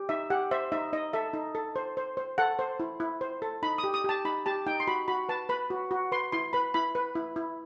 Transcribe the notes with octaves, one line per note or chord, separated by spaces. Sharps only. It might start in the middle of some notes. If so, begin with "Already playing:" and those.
Already playing: G4
D#4 E5
G4 F#5
C5 E5
D#4 E5
D#4 D#5
A4 E5
D#4
A4
C5
C5
C5
A4 F#5
C5
E4
E4
C5
A4
D#4 B5
D#6
G4
D#6
G4 A5
D#4 B5
G4 A5
D#4 G5
C6
F#4 B5
F#4 B5
B4 A5
B4 B5
F#4
F#4
B4 C6
E4 C6
B4 B5
E4 B5
B4
E4
E4